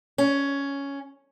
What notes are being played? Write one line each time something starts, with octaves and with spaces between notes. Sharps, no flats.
C#4